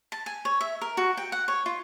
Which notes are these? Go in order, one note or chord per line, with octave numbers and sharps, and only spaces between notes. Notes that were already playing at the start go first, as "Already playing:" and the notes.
A5
G#5
C#5
E5
A#4
F#4
G5
F#5
C#5
F4